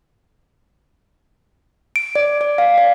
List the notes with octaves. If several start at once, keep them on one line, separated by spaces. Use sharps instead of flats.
D7
D5
D5
F5
D5